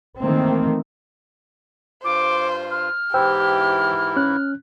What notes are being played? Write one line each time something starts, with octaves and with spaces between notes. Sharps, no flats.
D#3 E3 A3 A#3 C4
G2 F4 C5 D6
F6
G#2 E3 E4 G4 C5 G5 E6
C#4 F#6